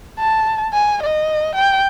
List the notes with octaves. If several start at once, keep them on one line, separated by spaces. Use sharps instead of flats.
A5
G#5
D#5
G5